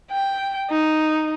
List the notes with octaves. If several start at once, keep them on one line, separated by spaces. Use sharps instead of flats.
G5
D#4